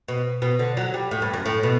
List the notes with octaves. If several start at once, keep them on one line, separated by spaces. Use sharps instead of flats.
B2
B2
D3
F#3
G3
A2
G2
F#2
A2
B2